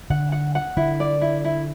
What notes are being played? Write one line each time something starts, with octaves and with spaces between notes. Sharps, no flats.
D3 F#5
F#5
F#5
D3 E4
D5
E4
E4